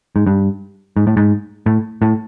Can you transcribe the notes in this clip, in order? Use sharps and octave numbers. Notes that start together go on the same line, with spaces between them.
G#2
G2
G#2
A2
G#2
A2
A2